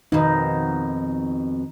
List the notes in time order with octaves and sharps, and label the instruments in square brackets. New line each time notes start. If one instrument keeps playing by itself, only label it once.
[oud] F2 B2 [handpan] D#3 D#4